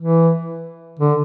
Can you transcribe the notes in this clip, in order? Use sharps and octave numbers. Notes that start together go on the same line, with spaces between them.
E3
D3